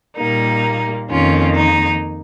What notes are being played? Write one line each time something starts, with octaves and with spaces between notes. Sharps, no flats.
A#2 G3 A#3 D#4
F2 D#3 A#3 C#4 F4
D#4